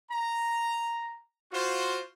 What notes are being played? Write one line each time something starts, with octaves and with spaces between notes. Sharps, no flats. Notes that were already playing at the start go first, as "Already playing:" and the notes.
A#5
F4 F#4 C5